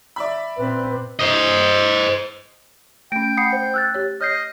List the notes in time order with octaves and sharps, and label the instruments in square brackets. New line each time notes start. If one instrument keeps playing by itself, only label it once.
[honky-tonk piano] D5 E5 B5
[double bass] A#2 C4 [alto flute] B4
[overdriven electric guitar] C5 D#5
[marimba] A3 C#4 [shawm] G5 [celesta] D7
[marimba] F#5 B5 [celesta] D#6 C7 C#7
[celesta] C5
E6 F#6 A6
[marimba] G4 C#5
[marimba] C#5 [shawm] D#5 [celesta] F6 G6 C7